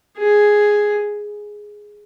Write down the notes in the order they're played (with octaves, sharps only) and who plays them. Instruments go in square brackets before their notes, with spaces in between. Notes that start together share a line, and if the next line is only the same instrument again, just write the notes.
[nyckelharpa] G#4